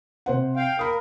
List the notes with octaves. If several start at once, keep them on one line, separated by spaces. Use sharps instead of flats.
C3 C5 F#5
F5 G5
A#4 F5 B5 D#6